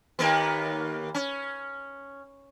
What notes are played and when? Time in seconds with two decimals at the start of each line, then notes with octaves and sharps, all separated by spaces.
0.19 D#2 A#3 B3
1.14 C#4